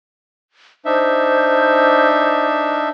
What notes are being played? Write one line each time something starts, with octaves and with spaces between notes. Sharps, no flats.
D4 D#4 C5 E5